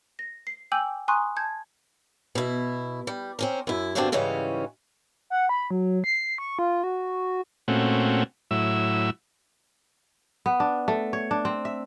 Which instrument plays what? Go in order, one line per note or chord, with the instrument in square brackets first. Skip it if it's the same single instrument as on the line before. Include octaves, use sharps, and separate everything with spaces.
[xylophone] A#6
C7
G5 G#5 D6 E6 G6 F#7
G#5 A#5 C6 C#6 D#6 F#6
A5 G6 G#6
[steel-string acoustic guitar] B2 E4
G3
C4 C#4 A#4
F#2 E4
G2 B2 D3 D#3 C4 D4
G#2 C#3 E3 G3 C#4
[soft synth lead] F#5
B5
F#3
C7
C#6
F4
F#4
[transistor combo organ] A#2 A3 C4 C#4 F#4
A2 F#3 E4 E6
[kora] B3
D4
A3
C#5
D4
C4
E5